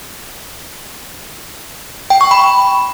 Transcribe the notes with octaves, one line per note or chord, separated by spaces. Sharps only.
G5
C#6
B5